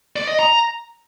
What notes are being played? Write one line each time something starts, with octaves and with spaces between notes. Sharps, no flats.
D5
D#5
A#5